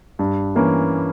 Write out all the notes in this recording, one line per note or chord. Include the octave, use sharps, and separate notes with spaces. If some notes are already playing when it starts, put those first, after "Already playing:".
G2
E3 A#3 C#4